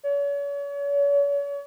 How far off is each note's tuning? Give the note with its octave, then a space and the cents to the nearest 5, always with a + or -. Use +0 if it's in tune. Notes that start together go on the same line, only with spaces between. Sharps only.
C#5 +40